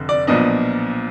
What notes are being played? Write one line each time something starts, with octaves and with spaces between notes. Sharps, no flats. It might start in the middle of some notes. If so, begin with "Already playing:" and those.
Already playing: F1 D3
D5
B1 A#2 F3 B3 D4 D#5